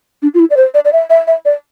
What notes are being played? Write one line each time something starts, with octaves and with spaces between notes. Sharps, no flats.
D4
F4
E4
D5
C5
D5
D5
E5
E5
E5
D5